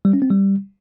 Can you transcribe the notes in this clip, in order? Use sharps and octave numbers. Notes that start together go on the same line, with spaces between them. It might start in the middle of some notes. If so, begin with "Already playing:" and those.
G3
C#4
C4
G3